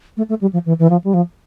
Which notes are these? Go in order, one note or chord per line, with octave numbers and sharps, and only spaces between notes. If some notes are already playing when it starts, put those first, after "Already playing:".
A3
A3
G3
F3
E3
E3
F3
G3
F3